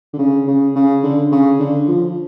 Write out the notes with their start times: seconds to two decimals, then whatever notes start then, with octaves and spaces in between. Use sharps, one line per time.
0.13 D3
0.19 C#3
0.48 C#3
0.76 C#3
1.03 D3
1.32 C#3
1.60 D3
1.88 F3